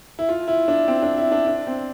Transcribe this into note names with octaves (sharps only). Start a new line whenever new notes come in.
E4
F4
E4
D4
C4
D4
E4
D4
D4
C4